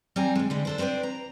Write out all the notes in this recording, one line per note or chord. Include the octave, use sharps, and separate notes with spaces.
G3 C4 G#5 A#5
G#2 G#3
D3 G3 G#3
D4 A4 C5
B3 C4 D4 B4 C5
A#5